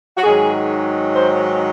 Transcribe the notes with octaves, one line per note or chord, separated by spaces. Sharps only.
F#4
G#2 D#3 F#3 G#4
C5